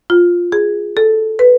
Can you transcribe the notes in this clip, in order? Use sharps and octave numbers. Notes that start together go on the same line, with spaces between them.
F4
G#4
A4
B4